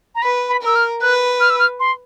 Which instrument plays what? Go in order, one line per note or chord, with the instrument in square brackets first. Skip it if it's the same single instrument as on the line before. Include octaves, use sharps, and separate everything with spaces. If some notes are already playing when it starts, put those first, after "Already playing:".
[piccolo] A#5
[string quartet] B4 [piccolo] B5
[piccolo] B5
[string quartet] A#4 [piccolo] E6
[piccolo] F6
[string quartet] B4 [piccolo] F#6
[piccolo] F6
E6
F6
C6